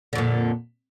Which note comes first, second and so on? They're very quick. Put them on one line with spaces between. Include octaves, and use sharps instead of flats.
D3 F2 A#2